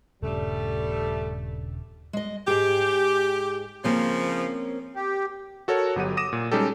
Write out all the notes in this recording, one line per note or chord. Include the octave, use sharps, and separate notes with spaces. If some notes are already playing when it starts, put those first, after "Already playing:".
D#1 G2 C#3 G3 A3
G#3 D#5
G#2 G4 G#4
C#3 F3 A#3 C4 C#4
G4
F#4 A4 A#4 C#5
G1 F#3 G4 F#5 D#7
D6 D#6 A#6 D#7 E7
A#2
G3 G#3 C#4 D#4 G4 A4